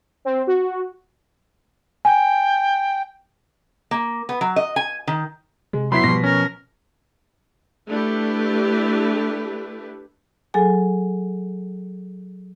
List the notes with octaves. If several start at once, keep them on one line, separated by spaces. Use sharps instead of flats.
C4
F#4
G5 G#5
A#3
B3
F#3
D#5
G#5
D#3
C3 G#3
F#3 B3 E4 B5 C6 B6
B2 F3 G3 A#6
C#4 A#4
A3 D4 E4 G4 B4
F#3 G#4 A4 G#5